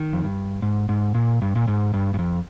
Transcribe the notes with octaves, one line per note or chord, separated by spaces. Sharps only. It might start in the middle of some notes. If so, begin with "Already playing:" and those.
Already playing: D#3
F2
G2
G#2
G#2
A#2
G2
A#2
G#2
G2
G2
F2